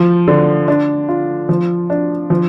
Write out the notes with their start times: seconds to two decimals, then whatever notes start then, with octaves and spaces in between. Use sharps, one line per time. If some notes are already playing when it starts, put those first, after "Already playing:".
Already playing: F3
0.28 D3
0.68 D4
1.09 F4
1.49 F3
1.90 D4
2.30 F3